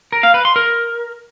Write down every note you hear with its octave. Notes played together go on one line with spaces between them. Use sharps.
A#4
F5
B4
C6
A#4